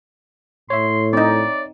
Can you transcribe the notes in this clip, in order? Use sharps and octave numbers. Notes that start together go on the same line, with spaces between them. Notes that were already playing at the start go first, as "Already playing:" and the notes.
A2 C#5 E5 C6
C4 D#4 D5